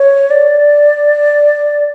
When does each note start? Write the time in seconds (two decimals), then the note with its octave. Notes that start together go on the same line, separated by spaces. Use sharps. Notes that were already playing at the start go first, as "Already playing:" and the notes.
Already playing: C#5
0.31 D5